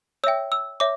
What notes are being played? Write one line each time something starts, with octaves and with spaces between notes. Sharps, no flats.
C#5 E5 G5 E6
E6
C#5 E5 D6